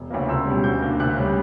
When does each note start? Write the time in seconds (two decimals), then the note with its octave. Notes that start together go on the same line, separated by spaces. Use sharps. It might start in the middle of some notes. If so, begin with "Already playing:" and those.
Already playing: E1
0.10 D2 C#3 E3 A#3
0.28 C#2 E6
0.46 B2 G3
0.64 D2 G6
0.82 D3 A#3
1.00 D2 F#6
1.17 C#3 G3